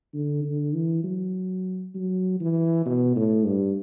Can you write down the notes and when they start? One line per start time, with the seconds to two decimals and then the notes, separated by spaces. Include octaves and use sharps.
0.14 D3
0.44 D3
0.74 E3
1.04 F#3
1.95 F#3
2.40 E3
2.86 B2
3.16 A2
3.46 G2